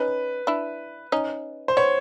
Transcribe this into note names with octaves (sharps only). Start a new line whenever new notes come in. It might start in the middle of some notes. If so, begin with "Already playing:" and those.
Already playing: C#4 D#4 B4
D4 E4
C#4 D#4
C5
B3 C#5